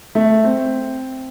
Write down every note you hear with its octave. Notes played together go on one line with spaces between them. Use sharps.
A3
C4